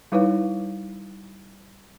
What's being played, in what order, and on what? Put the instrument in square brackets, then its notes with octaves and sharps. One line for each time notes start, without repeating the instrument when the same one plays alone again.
[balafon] G3 D#4 E4 B4 C#5 F5